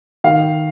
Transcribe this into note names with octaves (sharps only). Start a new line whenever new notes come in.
D#3 F5